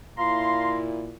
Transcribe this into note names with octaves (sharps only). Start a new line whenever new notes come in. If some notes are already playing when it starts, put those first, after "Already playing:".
A#2 E4 F5 A#5 C6